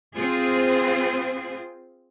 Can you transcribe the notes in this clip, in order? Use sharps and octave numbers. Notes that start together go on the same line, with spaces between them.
C4 F4 G#4 C5